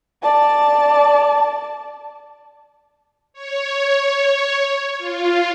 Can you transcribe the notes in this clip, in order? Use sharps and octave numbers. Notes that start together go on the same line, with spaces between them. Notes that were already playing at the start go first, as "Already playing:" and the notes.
D5 A5
C#5
F4